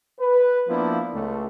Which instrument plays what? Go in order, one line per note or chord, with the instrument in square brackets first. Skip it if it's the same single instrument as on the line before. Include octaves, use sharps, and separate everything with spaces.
[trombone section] B4
F3 A#3 B3 D4 E4
C#2 A3